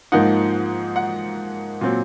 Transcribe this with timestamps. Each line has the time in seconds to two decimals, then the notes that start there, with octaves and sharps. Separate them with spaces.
0.12 G#2 F3 A#3 D#4 F#5
0.96 F#5
1.81 A#2 F#3 C4